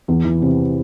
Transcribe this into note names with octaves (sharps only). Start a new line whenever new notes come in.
E2
E3
C3